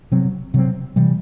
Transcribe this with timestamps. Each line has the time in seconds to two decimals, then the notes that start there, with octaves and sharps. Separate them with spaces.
0.12 C3 F#3 C4
0.54 C3 F#3 C4
0.96 C3 E3 G3